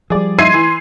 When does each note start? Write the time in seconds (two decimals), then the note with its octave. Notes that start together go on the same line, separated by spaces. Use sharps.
0.10 F3 G3 G#4 D5
0.39 D#4 E5 C6 G#6 C7 D#7
0.54 E3